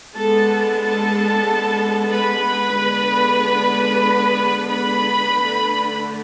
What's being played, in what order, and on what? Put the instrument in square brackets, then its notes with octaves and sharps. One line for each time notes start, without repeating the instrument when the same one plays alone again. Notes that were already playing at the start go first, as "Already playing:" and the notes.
[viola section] G#3 B3 D4 A4 A5
A4 A5
B4 B5
D3 G#3 B3 D4
B4 B5
D3 A3 D4